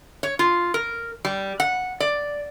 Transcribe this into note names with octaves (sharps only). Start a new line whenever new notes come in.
C#5
F4
A#4
G3
F#5
D5